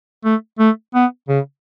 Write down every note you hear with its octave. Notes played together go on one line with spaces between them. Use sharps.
A3
A3
B3
C#3